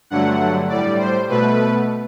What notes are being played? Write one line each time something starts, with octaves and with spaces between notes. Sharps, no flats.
G2 D3 F#3 A3 F#5
A2 G3 D5
C5
B2 A3 B4